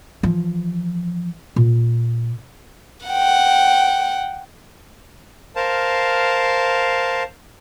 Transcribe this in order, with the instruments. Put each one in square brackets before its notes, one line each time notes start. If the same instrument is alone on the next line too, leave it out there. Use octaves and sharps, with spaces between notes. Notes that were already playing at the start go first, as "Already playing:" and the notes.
[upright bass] E3 F3
A#2
[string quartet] F#5 G5
[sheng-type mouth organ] A#4 C5 F5 A5